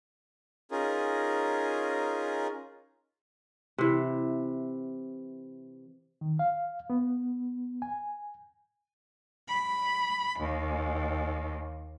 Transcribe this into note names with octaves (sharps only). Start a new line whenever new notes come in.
C#4 D#4 F4 G#4 A#4
C3 E3
D#3
F5
B3
G#5
B5
D#2